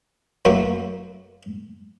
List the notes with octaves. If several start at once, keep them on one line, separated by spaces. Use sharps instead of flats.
F#2 A3 A#3 F#4